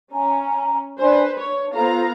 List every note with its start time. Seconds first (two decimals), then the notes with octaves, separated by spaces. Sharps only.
0.12 C#4 G#5 A#5
1.00 D4 B4 C5 D5 G#5
1.38 D4 C#5
1.75 B3 F4 A4 C5 F5 A#5